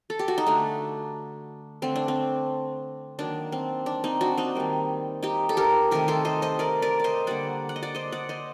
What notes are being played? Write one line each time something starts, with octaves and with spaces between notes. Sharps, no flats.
A4
G4
F#4
D#4
D3 A3 D4
D3 A3 C4
D4
C4
D#3 F#3 A#3 D4
C4
D4
C4 D#4
D4 F#4
C4 D#4
D#3 G3 A#3
D#4 G4
A4
G4 A#4
C3 D#3 A3 G4 A#4
A4 C5
C5 D#5
C5 D#5
A#4 D5
A#4 D5
C5 D5 D#5
D3 G3 A#3 D5 F#5
F#5
D#5
D5 F#5
C5 D#5
D5 F#5
C5 D#5